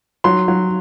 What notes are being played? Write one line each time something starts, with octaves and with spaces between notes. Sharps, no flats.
F#3 C6
F#3